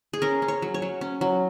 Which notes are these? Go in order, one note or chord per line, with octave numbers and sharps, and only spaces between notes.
G#4
C#4 A#4
C#4
C#5
F#3
C#5
F#3
C#4
F#3